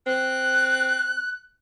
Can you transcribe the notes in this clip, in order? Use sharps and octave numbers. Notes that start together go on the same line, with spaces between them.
C4 F#6